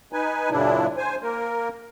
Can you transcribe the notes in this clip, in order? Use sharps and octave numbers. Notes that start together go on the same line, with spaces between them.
D#4 B4 G#5
F#2 A#2 C#3 D4 E4
C5 G#5
A#3 A#4